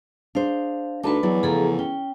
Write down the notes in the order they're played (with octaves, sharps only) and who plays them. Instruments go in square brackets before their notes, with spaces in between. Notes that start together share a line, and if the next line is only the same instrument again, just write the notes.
[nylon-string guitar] D4 G#4 C5 [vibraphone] F5
[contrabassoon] D2 [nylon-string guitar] D#4 A5 [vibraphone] B4 B5 D6
[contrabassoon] E2 [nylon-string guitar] F#3 D5
[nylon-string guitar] C#3 F3 A3 [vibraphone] G#4 A4 A#5
[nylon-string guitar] C#4 [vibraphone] G5